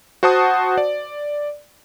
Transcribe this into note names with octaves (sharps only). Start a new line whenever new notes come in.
F#4 C5 F#5 A5 D#6
D5